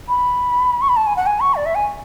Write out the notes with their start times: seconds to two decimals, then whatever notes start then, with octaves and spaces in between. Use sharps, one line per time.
0.08 B5
0.81 C#6
0.89 B5
0.96 A5
1.07 G#5
1.16 F#5
1.26 G#5
1.40 C#6
1.55 D5
1.66 E5
1.75 G#5